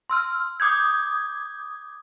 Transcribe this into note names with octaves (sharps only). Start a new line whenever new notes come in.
C6 E6 F6
D6 D#6 G6 G#6